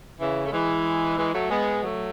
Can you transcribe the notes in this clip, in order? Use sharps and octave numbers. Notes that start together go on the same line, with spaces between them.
C#3 E3
A3
E3 G#3
E3 G#3
F#3 A3
G#3 B3
F#3 A3